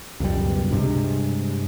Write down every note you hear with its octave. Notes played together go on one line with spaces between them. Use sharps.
C#2 F#2 B2 G3
G2 C3 G3 G#3